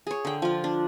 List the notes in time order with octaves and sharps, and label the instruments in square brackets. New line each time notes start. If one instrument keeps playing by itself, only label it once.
[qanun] G#4 C#5
D3 G5
F3 F4
D4